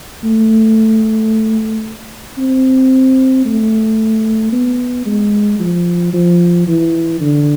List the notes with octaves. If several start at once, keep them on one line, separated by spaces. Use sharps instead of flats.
A3
C4
A3
B3
G#3
F3
F3
E3
D3